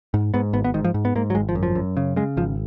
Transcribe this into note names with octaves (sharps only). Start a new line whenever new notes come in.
G#2
G#2 B3
G#1 B3
B3
G#2 D#3
F3
G#2
B3
G#2 A#3
F#3
G#1 G#3
F3
F#2
F3
F#2
C#3
C#3 G#3
G#1 F3